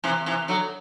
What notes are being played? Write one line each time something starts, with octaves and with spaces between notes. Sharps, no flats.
C3 E3
C3 E3
D3 F#3